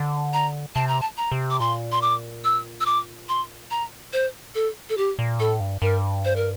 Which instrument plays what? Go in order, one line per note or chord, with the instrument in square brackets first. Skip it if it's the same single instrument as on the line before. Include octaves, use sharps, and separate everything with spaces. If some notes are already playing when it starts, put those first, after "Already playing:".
Already playing: [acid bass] D3
[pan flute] A#5
[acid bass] C3 [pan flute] A5
[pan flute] A#5
A5
A#5
[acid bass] C3
[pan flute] D6
[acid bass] A#2 [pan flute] C6
[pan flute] C6
D6
E6
E6
D6
C6
A#5
C5
A4
A4
G4
[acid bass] A#2
[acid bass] A2 [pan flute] A4
[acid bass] G2
[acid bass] G2 [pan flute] A#4
[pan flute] C5
A#4